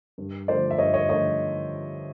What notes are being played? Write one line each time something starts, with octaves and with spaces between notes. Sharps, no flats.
G2
D3 F3 A3 C5 D5
E5
G2 C#5 D#5
C#5 D#5
D3 F3 A3 C#5 D#5